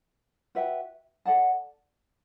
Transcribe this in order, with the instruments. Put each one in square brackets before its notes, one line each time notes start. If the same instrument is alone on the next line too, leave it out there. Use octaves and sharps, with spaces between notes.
[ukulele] F#4 B4 E5 G5
A4 D5 F#5 A5